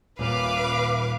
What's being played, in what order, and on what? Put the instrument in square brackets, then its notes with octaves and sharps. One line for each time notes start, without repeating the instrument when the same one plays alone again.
[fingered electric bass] D#1 A#2 [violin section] B4 F5 D6